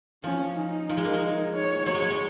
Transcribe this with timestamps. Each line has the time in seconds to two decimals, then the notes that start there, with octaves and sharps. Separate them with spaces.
0.24 F3 C#4
0.57 D#4
0.90 F3
0.97 G#3
1.05 A#3
1.14 G#3
1.54 C#5
1.86 F#3 C#5
1.94 G#3
2.02 F#3
2.10 G#3